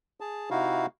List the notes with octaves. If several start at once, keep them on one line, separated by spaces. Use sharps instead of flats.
G#4 A5
C3 D#4 E4 F#4 F5